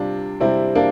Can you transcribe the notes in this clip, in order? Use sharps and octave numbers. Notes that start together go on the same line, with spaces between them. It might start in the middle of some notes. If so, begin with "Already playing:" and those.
Already playing: C3 G3 D4 F4
C3 G3 C4 E4
A#3 D4